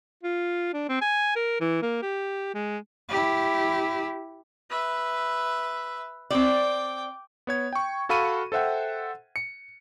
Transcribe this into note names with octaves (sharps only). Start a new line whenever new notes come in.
F4
D4
C4
G#5
A#4
E3
A#3
G4
G#3
E4 G4
B4 E5
C4 D5 G5 D6
B3 C#5 G#6
G5 C#6
F#4 A4 F5 B5 C#6 D#7
A4 C5 E5 F#5 G5
C#7